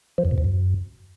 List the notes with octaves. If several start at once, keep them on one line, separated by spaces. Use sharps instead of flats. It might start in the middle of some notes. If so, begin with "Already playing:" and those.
F3
F2
A#2
E2
F#2